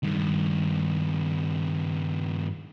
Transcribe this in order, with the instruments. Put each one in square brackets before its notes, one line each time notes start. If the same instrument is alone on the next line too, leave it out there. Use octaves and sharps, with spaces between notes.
[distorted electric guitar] G2 D#3